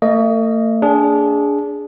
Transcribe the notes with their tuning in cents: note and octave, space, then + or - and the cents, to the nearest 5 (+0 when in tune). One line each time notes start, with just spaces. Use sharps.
A3 +40 D#5 +0
D4 -20 G#4 +0